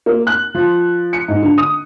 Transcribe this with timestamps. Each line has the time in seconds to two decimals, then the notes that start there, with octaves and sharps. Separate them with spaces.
0.06 A#3
0.27 F#6
0.54 F3
1.13 C#7
1.28 G#2
1.42 D3
1.58 D#6